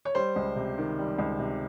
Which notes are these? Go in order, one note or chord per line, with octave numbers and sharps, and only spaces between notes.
C#5
G3 C5
C#2
C3
D#3
G3
C#2
C3